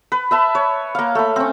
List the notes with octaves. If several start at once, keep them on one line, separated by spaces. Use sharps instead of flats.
B4
B4 E5 A5
C#5
A#3 F5
A3 B5
C4 C#4